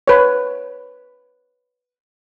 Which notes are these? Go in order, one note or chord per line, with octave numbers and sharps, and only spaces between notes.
B4 C#5